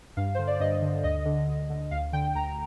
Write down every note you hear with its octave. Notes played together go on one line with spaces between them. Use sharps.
G2 F5
D3 C5
D5
G2 D#5
D3
D2 D#5
D3
D2
D3
D2 F5
D3 G5
D2 A#5